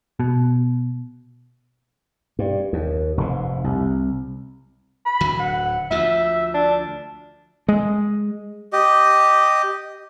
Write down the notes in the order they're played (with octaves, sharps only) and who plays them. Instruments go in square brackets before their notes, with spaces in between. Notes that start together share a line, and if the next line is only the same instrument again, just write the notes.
[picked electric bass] B2
[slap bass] G2
D#2
F1 G#2
C2
[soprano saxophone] B5
[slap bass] D1 D3 F#3
[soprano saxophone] F#5
[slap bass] D2 F3 [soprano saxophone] E5
[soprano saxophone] D4
[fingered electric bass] G#3
[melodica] G4 D#5